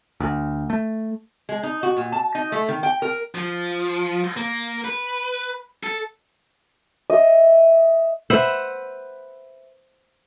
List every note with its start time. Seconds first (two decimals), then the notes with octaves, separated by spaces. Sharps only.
0.20 D2
0.70 A3
1.49 G#3
1.63 D#4
1.83 F#4
1.97 A#2
2.12 A5
2.35 D#4
2.52 A3
2.68 D#3
2.83 G5
3.02 A#4
3.35 F3
4.37 A#3
4.85 B4
5.83 A4
7.10 D#5 E5
8.30 B4 C5 E5 F#5